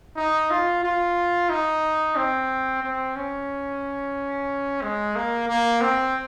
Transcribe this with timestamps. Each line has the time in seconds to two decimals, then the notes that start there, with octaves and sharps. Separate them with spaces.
0.17 D#4
0.50 F4
0.83 F4
1.50 D#4
2.16 C4
2.82 C4
3.16 C#4
4.82 G#3
5.16 A#3
5.48 A#3
5.81 C4